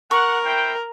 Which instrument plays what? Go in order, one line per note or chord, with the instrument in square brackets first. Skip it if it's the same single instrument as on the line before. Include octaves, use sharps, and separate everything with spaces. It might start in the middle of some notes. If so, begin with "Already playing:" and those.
[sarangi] A#4 [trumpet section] F#5 [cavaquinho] C#6
[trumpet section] E4 C5 G5